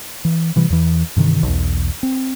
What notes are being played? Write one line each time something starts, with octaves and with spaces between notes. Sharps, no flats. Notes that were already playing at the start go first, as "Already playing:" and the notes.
E3
C3 E3 G3
E2 E3
G2 C3 D#3 E3
B1 E2
C4